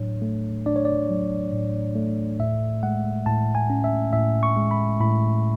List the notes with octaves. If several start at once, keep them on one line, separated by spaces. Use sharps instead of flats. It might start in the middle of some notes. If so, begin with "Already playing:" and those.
Already playing: A2 F#3 D4 C#5
A3
D4 D5
C#5
D5
F#3
A2
A3
A2 E5
G#3 F#5
A2 A5
G#5
C#4
E5
A2 E5
C#6
G#3
B5
A2 B5